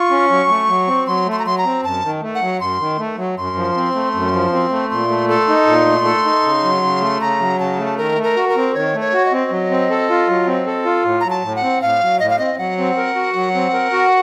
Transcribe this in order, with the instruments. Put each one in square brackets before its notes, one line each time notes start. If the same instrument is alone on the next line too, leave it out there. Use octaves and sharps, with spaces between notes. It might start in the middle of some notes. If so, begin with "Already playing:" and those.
Already playing: [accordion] F4 [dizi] C#6
[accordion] C#4
F#3
A3
F#3
C4
[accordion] F#3 [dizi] C6
[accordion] A3
[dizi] C6
A#5
[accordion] F#3 [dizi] C6
[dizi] A#5
[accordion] C4
[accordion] F#2 [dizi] A5
[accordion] D#3
A3
[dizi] F#5
[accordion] F#3
[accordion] F#2 [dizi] C6
[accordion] D#3
A3
F#3
[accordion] F#2 [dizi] C6
[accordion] F3
C4
A3
F#2
F3
C4
A3
[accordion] A#2 [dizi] C6
[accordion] A3
[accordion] A4 [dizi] C6
[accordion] D#4
A#2
A3
A4
D#4
C#3
F#3
C#3
A3
[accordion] C#3 [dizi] A#5
[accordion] F#3
[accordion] C#3 [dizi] A5
[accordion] A3
[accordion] D#3 [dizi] A#4
[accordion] A3
[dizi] A#4
[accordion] F#4
[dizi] A#4
[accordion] C4
[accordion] D#3 [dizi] C#5
[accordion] A3
[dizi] C#5
[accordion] F#4
[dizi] D#5
[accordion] C4
F#3
C4
A4
F4
F#3
C4
A4
F4
A2
[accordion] F#3 [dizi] A#5
[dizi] A5
[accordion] A2
[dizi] F#5
[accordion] C4
[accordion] A2 [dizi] F5
[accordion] F#3
[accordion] A2 [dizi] D#5
[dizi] F5
[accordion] C4 [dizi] D#5
[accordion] F#3 [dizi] F#5
[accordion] C4
A#4
F#4
F#3
C4
A#4
F#4